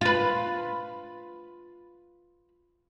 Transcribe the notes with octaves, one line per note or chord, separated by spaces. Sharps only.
F4 B4